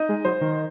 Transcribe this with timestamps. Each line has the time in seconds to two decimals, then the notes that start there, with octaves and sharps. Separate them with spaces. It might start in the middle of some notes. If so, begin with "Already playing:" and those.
Already playing: D#4 D#5
0.09 G#3
0.25 F#3 C5
0.41 D#3